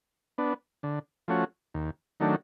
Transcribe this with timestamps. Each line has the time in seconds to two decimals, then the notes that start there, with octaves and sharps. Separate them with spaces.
0.38 B3 D4
0.83 D3
1.28 F3 A3 C#4 F#4
1.74 D#2
2.20 D#3 F#3 A3 D4